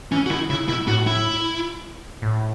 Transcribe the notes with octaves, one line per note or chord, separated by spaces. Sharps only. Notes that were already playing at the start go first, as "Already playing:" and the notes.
E3 C#4
F#4
D#3 E4
C#3 E4
B2 E4
A2 F#4
E4
A2